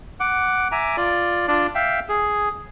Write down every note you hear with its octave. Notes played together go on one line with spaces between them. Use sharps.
F#5 D6
E5 G#5 A#5 D6
F4 D5
D4 F4 D5
E5 F5 G5
G#4